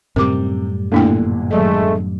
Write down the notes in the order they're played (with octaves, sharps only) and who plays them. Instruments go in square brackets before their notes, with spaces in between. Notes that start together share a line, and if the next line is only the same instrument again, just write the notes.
[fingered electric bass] F#2 A2 G3 [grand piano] C3 [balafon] A#4 D6
[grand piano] G1 A#2 D3 [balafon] A3 E4 G5
[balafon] D#3 F#3 D#5 [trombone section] G#3 A3